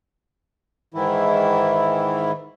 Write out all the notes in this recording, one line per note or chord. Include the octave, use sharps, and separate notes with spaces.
G#2 D#3 E3 E4